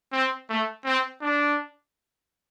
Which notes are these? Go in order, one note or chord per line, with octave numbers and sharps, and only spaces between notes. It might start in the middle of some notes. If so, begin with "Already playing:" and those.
C4
A3
C4
D4